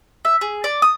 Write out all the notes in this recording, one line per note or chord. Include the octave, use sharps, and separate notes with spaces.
E5
G#4
D5
D#6